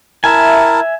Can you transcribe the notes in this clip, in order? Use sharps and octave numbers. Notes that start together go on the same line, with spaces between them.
E4 A#4 E5 G#5 A5